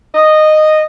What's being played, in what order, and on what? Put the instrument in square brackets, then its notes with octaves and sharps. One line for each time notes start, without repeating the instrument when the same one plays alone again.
[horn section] D#5